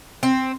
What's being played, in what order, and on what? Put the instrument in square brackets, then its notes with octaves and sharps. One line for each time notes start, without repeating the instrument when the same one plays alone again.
[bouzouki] C4